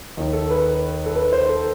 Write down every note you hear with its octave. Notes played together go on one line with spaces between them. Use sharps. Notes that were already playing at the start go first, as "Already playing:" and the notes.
D#2 D#3
A4
B4
A4
B4
C5
A4